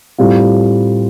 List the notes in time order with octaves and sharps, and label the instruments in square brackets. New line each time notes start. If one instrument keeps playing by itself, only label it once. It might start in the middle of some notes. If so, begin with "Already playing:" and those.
[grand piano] A2 G3 C4 F4